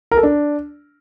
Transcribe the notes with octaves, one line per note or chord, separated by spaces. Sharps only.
A#4
A4
D4